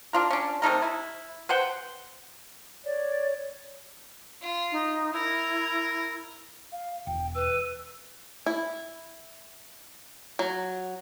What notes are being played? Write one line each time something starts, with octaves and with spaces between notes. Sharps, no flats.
D4 F4 A#4
C#4 D4
C3 A3 D#4 A#4
E4
B4 C5 F#5 G5
C#5 D5
F4
D#4
E4 A#4
F5
E1 G5
B4 E6
E4
F#3